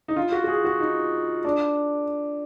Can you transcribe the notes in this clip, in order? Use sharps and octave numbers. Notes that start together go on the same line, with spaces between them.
D#4
F4
F#4
F#4
G#4
F#4
D#4
D4